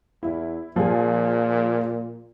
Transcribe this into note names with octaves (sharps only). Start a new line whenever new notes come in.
E2 E4
A#2 F3 G#4